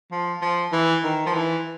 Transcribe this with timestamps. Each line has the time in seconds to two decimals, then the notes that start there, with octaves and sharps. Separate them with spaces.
0.11 F3
0.42 F3
0.72 E3
1.04 D#3
1.26 F3
1.35 E3